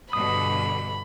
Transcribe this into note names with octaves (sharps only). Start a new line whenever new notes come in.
G2 B2 D3 B5 D#6